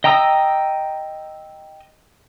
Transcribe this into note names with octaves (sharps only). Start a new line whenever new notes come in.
D#5 G5 A#5 D#6 E6